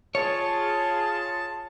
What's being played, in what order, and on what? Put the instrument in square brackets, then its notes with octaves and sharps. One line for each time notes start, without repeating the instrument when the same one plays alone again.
[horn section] F4 G#4 [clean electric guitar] C#5 [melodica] A5